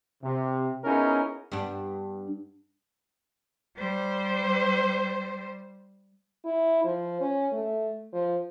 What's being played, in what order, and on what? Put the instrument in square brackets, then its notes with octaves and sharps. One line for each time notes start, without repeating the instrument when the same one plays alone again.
[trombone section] C3
B3 C#4 D#4 E4 G#4 A#4
[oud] G2 B3 D4
[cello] G3 C5
[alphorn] E4
F3
C#4
A3
F3